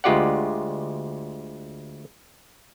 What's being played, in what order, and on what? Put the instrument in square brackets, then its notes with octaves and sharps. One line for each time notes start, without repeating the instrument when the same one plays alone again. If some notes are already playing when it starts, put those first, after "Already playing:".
[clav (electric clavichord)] D2 G#3 F4 G4 D5 F#5